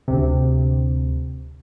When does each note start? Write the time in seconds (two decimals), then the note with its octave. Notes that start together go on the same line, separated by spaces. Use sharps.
0.08 D2 C3